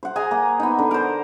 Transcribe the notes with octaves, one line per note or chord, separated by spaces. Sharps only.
C5 F#5
G#4 D#5 G#5 A#5
A#3
B3 D#4
D3
A#4 C5